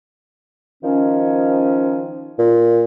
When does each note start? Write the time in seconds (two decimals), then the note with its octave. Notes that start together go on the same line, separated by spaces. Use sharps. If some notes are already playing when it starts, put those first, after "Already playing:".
0.83 D#3 F3 C#4
2.39 A#2